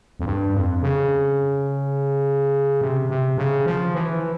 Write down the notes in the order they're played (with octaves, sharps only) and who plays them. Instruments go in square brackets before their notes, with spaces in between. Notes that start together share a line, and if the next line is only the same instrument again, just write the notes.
[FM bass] F2
G2
F2
C#3
C3
C3
C#3
F3
E3